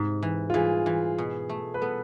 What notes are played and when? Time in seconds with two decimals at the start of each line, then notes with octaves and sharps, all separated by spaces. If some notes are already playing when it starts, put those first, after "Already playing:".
Already playing: G#2 C3
0.23 E3
0.50 F4
0.54 E3 G#4
0.86 E3
1.18 B2
1.49 A3
1.74 B4
1.81 B3 A4